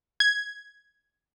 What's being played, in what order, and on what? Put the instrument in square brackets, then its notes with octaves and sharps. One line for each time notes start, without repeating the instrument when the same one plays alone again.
[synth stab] G#6